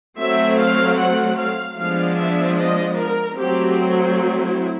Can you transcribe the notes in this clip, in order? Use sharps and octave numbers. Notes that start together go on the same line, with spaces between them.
F#3 A3 C4 E5
F5
F#5
F5
F3 G#3 B3 D4 F5
E5
D#5
A#4
F#3 A3 C4 G4
E4